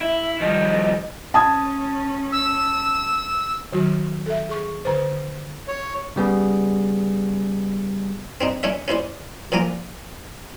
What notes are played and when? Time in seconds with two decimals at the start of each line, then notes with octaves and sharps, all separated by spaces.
0.01 E4 E5
0.40 D#3 F3 G3 D#5
1.34 C#4 A5 D#6 G#6
2.32 E6
3.72 D#3 F#3 F#4
4.26 A4 E5
4.49 G#4 C#6
4.85 D3 C5
5.68 C#5
6.16 C#3 G3 B3 G#4
8.41 C4 D4 D#4
8.63 C#4 D4 C#5 E5
8.88 C#4 E4 C5 D5
9.52 A#2 F3 G#5 A#5 D6